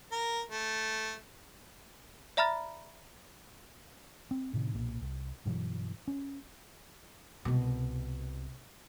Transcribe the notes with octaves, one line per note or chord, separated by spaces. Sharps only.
A#4
A3
D5 E5 A#5 B5 F6 A6
C4
A2 C3 D#3
B1 A#2
C2
G2 B2 E3 F#3
C#4
C2 B2